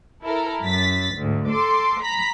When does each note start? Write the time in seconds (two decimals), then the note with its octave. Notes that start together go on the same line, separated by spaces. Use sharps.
0.24 E4 A4 A#4
0.64 F#2 A6 B6
1.17 D2 G#2
1.48 A4 C6 D6
2.03 A#5 B5 B6